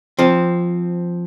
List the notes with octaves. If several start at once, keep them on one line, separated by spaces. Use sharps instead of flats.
F3 C4